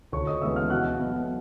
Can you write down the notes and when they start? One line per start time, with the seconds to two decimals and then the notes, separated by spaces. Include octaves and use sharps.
0.12 D2 C#5 C#6
0.27 D#5 D#6
0.41 C#3 E3 G#3 B3 E5 E6
0.56 F5 F6
0.70 B2 F#5 F#6
0.99 F#3 B3